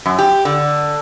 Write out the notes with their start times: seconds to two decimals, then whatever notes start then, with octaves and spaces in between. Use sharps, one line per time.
0.06 F#2
0.19 G4
0.45 D3